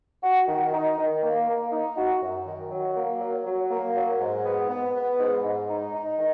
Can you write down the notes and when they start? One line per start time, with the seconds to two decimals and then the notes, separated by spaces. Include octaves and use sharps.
0.23 F#4
0.48 D#3
0.73 D#4
0.98 D#3
1.22 A#3
1.47 A#3
1.71 D#4
1.97 F#4
2.21 F#2
2.46 D#3
2.71 F#3
2.96 A#3
3.20 F#3
3.46 F#3
3.70 A#3
3.95 F#3
4.20 G#2
4.45 B3
4.69 B3
4.95 B3
5.19 G#2
5.44 G#2
5.69 D#4
5.94 D#4
6.18 D#3